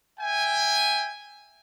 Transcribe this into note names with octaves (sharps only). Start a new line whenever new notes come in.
E5 G5 G#5